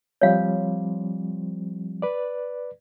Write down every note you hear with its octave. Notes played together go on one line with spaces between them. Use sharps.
F3 G3 C4 C#5 F5
B4 D5